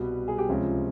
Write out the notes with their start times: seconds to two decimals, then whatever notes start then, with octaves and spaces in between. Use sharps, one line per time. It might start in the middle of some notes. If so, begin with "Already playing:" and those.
Already playing: C2 B2 G3 B4
0.28 G#4
0.38 G4
0.49 C#2 C3 F3 C#4